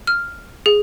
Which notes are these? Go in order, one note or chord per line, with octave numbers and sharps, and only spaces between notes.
F6
G#4